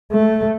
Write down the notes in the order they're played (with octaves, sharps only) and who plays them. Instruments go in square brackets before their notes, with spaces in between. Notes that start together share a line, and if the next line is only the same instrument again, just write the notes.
[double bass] A3